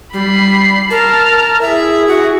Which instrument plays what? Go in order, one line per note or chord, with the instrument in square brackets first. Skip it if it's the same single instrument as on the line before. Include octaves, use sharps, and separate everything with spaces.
[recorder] G3 [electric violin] B5 C7
[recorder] A#4 [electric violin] A5 F6
[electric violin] E4 G#4 [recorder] E5
[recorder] F#4